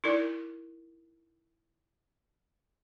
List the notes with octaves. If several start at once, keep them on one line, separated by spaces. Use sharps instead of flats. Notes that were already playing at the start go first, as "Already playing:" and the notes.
D#4 E4 A#4 D5